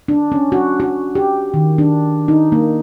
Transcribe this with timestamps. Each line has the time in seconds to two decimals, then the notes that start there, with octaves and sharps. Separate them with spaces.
0.08 D4
0.32 C#4
0.52 F#4
0.80 F#4
1.15 G4
1.54 D#3
1.78 D4
2.28 D#4
2.52 A#3